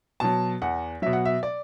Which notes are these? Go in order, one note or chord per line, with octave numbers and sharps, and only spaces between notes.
B2 F#3 A5
E2 F#5
B2 F#3 E5
F#5
E5
D5